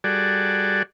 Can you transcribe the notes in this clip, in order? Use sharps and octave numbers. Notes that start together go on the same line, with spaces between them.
G3 F#4 G#4 A4 D5